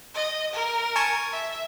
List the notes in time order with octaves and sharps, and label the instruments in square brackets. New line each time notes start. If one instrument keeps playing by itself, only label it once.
[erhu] D#5
A#4
[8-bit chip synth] G#5 A5 C#6
[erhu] E5